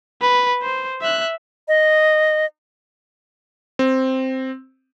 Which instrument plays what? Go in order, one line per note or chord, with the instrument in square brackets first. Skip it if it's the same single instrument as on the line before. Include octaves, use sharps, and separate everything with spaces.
[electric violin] B4
C5
E5 F#6
[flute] D#5
[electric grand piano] C4